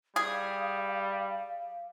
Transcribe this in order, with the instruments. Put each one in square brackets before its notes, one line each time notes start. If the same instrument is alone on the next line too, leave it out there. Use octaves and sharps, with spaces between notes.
[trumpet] G3 [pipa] G#4 [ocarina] F5